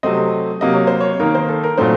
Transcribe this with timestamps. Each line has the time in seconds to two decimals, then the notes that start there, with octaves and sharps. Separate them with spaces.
0.03 C3 F#3 A3 C4 D#5
0.61 C3 F#3 A#3 D#5
0.74 C#5
0.87 C5
1.01 C#5
1.20 D#3 A#3 D#4 A#4
1.35 C5
1.49 A4
1.64 A#4
1.77 A#2 F#3 A3 C4 D#4 C5